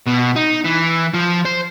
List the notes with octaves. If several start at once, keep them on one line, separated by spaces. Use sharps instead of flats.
B2
D#4
E3
F3
C5